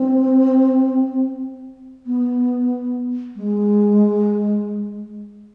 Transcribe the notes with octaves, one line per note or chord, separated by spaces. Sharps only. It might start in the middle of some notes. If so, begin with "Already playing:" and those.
Already playing: C4
B3
G#3